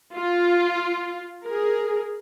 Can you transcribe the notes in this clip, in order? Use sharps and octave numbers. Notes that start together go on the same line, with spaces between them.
F4
G#4 A#4